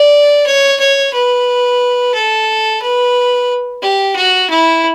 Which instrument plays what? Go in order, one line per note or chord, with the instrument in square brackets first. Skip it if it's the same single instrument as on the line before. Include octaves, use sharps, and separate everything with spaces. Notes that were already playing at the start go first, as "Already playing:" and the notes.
Already playing: [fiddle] D5
C#5
C#5
B4
A4
B4
G4
F#4
E4